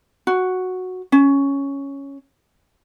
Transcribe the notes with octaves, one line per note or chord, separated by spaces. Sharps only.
F#4
C#4